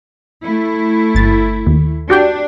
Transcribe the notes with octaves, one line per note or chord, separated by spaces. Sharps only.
A3 E4
G1 A6
D#2
D4 F#4 G4 G5